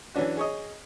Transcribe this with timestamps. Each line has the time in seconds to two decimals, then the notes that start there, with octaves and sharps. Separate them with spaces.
0.15 E3 F#3 C#4 D4 F#4
0.37 G#4 C#5 D#5